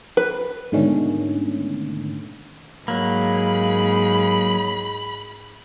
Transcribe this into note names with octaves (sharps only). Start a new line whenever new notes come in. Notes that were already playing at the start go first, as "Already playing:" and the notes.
B4
G#2 B2 D3 D#3 A3 C#4
G#2 F#3 A#3 B5